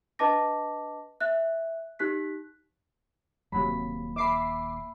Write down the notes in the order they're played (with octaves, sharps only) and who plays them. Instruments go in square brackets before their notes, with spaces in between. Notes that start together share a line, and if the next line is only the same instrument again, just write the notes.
[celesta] D4 B4 D#5 A5 D6 A#6
E5 F#6
D#4 G4 F#6 B6
[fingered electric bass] D#1 A#3 [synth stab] C3 F#3 [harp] B5
[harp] E5 B5 [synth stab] D6 C7